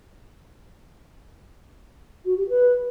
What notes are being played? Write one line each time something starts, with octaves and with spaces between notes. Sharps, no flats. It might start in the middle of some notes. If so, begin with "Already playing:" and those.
F#4
G4
B4